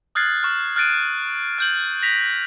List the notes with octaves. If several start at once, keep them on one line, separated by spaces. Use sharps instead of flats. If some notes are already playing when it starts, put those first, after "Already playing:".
D#6 F6 F#6 G#6 A6 C7
C#6 F6
F6 F#6 A6 D7 D#7
F6 G6 F#7
A#6 B6 F7